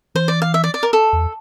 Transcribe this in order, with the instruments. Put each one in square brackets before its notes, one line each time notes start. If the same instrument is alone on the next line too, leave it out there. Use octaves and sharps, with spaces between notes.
[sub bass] E3 [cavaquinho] C5
[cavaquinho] D5
F5
E5
D5
D5
A#4
A4
[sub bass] E2